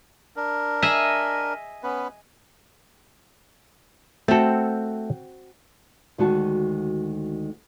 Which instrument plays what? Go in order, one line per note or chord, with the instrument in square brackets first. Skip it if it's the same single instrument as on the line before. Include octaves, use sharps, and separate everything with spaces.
[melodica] D4 A#4
[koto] G#4 D#5 E5
[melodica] B3 C#4 B4
[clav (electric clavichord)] A3 A4 [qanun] C4 F#4
[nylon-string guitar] D2 D#3 G#3 F#4 A5